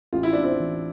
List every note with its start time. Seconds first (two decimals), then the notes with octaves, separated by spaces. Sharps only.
0.13 A1 F4
0.23 E4
0.33 A2 D4
0.43 C4 E4
0.59 E3